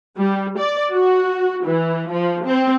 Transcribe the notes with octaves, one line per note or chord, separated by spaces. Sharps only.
G3
D5
F#4
E3
F3
C4